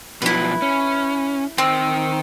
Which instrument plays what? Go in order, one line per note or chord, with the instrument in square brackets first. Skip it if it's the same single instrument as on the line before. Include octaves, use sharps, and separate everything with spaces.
[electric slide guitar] B2 F3 F#3 [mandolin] E4 B4
[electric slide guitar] C#4
[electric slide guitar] D#3 G5 [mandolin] C4